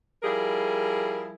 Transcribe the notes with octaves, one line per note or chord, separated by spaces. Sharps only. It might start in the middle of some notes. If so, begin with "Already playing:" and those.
F3 G3 E4 G#4 A#4